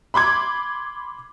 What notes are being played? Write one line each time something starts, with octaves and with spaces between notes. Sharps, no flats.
B5 C6 D6 G#6